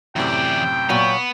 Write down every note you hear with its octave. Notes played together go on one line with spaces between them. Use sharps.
F#2 A2 C3 E3 D5 G5
A#2 F#3 B3 C#5